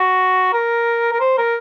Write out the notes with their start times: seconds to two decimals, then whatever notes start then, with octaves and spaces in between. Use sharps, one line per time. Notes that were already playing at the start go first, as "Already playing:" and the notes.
Already playing: F#4
0.53 A#4
1.12 A#4
1.20 C5
1.38 A#4